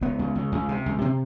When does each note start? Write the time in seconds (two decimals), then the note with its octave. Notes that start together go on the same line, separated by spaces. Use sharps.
0.01 C#2 B3
0.19 C#2
0.35 C#2
0.52 C#2
0.69 C3
0.86 C#2
1.01 C3 C4